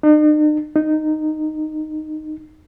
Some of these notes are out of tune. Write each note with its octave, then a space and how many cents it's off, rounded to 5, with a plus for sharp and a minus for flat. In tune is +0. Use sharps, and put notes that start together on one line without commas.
D#4 -45
D#4 -10